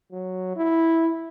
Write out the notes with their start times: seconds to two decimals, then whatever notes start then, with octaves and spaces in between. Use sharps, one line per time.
0.12 F#3
0.56 E4